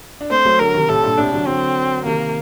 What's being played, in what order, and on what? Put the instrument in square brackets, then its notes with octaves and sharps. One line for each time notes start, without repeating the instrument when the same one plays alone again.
[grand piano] D4
[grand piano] A3 C4 [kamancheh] C5
[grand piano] F#3 A3
[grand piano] D3 F#3 [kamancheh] A#4
[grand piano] C3 D#3
[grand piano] A2 C3 [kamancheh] A4
[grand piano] G2 A#2
[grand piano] A2 C3 [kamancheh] D4
[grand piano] D3 F#3
[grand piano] D3 F#3 [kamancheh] C4
[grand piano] C3 D#3 [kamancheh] A#3